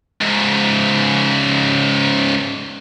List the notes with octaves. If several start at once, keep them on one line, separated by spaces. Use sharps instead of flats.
C#2 G#2